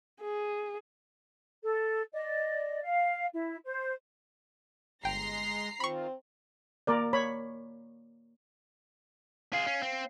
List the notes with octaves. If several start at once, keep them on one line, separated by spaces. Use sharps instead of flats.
G#4
A4
D5 D#5
F5
E4
C5
G1 G#3 G5 A#5 C6 A#6 C7
D#3 C4 F4 B5 C#6
A#3 A#4 D5
C#5 B5
F4 G#4 F5 C7
C#4
C4